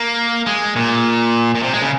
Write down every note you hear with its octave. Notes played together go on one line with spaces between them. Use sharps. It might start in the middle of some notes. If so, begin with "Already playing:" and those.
Already playing: A#3
G#3
A#2
A#2
C3
G#3
C#3